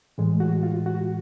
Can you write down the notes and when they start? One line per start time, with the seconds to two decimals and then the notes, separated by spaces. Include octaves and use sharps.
0.18 A2 E3 G#3
0.40 F#4
0.63 F4
0.86 F#4